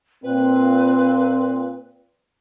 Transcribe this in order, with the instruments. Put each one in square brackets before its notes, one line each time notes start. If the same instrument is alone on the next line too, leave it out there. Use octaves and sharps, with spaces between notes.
[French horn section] A#2 C4 [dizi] B4